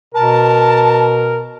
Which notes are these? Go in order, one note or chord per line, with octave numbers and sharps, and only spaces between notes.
B2 A#4 A5